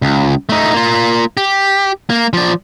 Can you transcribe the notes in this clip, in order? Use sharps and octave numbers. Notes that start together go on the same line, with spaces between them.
C#2
A3 D#4
A#3 F4
G4
A#3
F3 D5